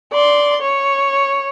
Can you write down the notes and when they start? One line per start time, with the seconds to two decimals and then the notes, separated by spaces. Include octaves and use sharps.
0.13 D5 C6
0.61 C#5